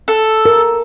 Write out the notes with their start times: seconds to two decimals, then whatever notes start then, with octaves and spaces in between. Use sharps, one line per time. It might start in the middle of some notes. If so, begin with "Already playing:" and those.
0.08 A4
0.46 A#4